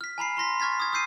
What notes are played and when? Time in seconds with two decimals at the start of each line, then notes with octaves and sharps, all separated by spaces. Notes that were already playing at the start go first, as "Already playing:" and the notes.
0.01 F6 B6
0.18 G#5 A#5 B5 C7
0.37 A#5 C6 A#6 B6
0.60 C#6 F6 G#6 A6 B6
0.80 D#6 G#6
0.92 D#6 E6 G6 C7 D#7